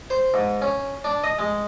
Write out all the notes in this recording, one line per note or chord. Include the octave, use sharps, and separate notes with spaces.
C5
G#2
C#4
D4
D#5
G#3